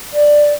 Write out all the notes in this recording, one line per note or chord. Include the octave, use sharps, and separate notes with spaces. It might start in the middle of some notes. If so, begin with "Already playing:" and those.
D5